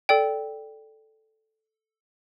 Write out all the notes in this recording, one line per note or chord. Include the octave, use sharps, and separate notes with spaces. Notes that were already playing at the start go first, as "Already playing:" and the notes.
A4 D5 G5